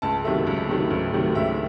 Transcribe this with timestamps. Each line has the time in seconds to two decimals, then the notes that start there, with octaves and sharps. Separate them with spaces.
0.02 C#2 A5
0.24 C3 D#3 F#3 A3 E5
0.47 C#2
0.69 C3 D#3 F#3 A3
0.91 C#2
1.13 C3 D#3 F#3 A3
1.35 C#2 E5